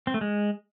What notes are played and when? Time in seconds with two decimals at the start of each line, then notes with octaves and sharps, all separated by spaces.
0.07 C4
0.14 A3
0.21 G#3